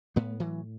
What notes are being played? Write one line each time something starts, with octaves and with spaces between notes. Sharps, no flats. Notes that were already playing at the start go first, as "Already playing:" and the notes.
A2 A3 B3
E3 F#3